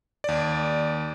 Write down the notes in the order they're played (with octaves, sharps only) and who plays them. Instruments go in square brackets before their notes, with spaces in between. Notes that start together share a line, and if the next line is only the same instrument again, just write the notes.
[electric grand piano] D#2 D5